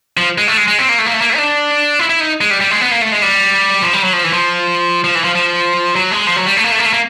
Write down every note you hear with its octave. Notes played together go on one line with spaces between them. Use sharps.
F3
G#3
A3
G#3
G#3
C4
A#3
A3
A#3
A3
A#3
A3
D#4
D4
E4
E4
D#4
G#3
G3
G3
G#3
B3
A#3
A3
G#3
G3
F3
G3
F#3
F3
E3
F3
F3
E3
F3
F3
F#3
G#3
F3
F#3
G3
A3
A#3
A3
A#3
A3
A#3